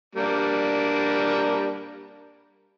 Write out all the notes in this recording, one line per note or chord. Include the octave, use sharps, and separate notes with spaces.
G3 A#3 D4